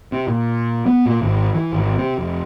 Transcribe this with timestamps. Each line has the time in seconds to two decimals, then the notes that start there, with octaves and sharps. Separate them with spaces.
0.12 C3
0.28 A#2
0.86 B3
1.06 A#2
1.22 G#1
1.54 E3
1.73 G#1
1.98 C3
2.19 F1